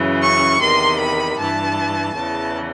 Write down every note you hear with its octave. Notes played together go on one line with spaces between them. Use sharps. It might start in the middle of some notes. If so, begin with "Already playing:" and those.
Already playing: F#2 C#3 E3
C#6
E2 C3 D#3 C6
B5
G2 E3 A5
E2 C#3 E3 A5